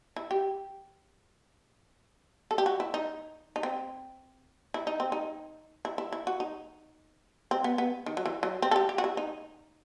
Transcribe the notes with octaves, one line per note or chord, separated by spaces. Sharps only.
E4
G4
A4
G4
F#4
E4
D#4
D#4
C4
E4
D#4
C4
D#4
E4
E4
E4
F#4
D#4
C4
B3
B3
D#3
F#3
E3
F#3
C4
A4
G4
G4
F#4
E4
D#4